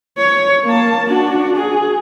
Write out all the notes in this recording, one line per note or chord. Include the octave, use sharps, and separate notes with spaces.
C#5
A#3 A5
D4 F#4
G#4